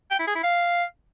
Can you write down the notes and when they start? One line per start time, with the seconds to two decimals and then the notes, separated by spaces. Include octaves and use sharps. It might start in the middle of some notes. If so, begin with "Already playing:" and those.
0.11 G5
0.19 E4
0.27 G#4
0.35 E4
0.43 F5